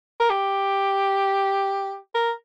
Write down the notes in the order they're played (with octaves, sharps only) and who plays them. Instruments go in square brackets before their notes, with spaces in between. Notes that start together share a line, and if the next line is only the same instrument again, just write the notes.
[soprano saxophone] A#4
G4
A#4